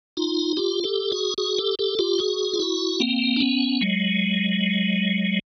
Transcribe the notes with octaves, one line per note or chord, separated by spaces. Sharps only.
D#4 F4
F4 G4
G4 A4
F#4 G#4
F#4 G#4
G4 A4
G4 A4
F4 G4
F#4 G#4
F4
E4 F#4
A#3 C4
D4
B3 C#4
F#3 G#3